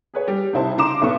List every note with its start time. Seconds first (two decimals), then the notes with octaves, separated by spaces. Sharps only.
0.14 G#4 B4 C#5
0.28 G3
0.53 C2 D#4 E4 C5 A5
0.77 C#3 D#4 A#5 C6 D6 E7
1.02 B1 B3 C#6